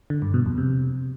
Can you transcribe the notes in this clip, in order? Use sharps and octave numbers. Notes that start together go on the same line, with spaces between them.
D3
G2
B2
F2
C3